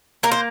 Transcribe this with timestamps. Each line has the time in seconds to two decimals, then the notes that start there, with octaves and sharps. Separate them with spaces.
0.23 A#3 A#4
0.32 C5